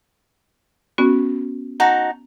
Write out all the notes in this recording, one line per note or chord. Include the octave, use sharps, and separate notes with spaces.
B3 C#4 F#4
D#4 F#4 A5 A#5